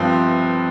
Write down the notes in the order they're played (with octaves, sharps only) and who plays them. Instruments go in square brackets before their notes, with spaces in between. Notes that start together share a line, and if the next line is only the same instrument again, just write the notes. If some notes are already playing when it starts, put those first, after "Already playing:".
Already playing: [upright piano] G1 G2 F3 C4